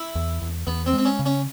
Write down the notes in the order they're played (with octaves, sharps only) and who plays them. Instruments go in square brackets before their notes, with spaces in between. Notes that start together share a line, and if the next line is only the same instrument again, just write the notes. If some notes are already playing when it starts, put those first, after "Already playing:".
Already playing: [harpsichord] E4
[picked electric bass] E2
E2
[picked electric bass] E2 [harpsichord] B3
[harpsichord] C4
[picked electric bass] G#3
[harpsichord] C4
C#4
[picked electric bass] C#3
[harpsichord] C#4